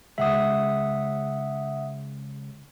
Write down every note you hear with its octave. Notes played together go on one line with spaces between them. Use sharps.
C#3 G#3 G#4 E5 F#5 D#6